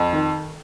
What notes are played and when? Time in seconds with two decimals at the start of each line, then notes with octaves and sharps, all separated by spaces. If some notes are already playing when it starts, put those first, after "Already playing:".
Already playing: F2
0.13 D#3